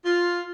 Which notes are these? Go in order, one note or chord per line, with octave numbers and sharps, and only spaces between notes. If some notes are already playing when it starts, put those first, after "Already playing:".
F4